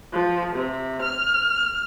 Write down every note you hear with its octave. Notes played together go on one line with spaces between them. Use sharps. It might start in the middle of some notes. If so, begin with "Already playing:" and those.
F3
C3
F6